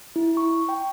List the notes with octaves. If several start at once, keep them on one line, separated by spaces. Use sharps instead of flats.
E4
C#6
G5